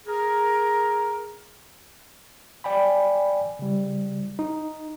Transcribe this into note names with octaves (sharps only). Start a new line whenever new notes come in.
G#4 A#4
D5 G5 G#5 B5
C#3 G3
D#4